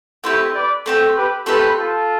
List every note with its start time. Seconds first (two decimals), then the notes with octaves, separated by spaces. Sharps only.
0.24 A3 C4 E4 G4
0.55 B4 D5
0.86 A3 C4 G4
1.16 G4 B4
1.46 A3 C4 F4 G4 A4 B4
1.77 F4 A4